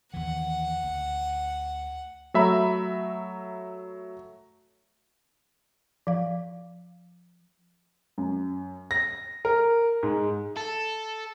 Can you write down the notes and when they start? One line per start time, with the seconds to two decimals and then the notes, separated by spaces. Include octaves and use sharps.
0.14 D#2 E3 F#5
0.84 D2
2.34 F#3 A3 E5 A#5 B5
6.07 F3 F5
8.18 F#2
8.91 A#6
9.45 A#4
10.03 G#2
10.57 A4